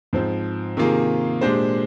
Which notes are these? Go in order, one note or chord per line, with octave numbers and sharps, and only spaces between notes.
G#2 F3 C4
C3 D#3 A#3 F4 G#4
A#2 G#3 D4 G4 C5